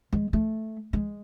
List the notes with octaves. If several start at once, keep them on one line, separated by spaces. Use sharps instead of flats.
G#3
A3
G#3